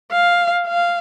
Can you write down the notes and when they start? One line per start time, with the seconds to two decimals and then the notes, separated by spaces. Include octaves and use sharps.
0.12 F5
0.68 F5